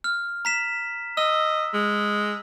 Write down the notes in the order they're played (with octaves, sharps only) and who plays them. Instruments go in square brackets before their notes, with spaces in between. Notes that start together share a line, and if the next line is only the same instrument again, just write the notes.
[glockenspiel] F6
A#5 B6 E7
[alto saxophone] D#5 [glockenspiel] E6
[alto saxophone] G#3